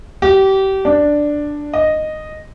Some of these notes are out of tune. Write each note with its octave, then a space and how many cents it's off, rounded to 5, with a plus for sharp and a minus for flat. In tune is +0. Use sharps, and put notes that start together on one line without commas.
G4 -25
D4 +5
D#5 -5